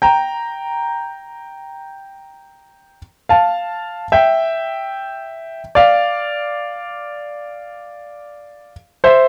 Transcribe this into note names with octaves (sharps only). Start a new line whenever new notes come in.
G5 A#5
F5 A5
E5 G5
D5 F5
C5 E5